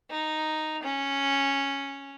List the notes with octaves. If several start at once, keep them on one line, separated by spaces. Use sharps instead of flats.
D#4
C#4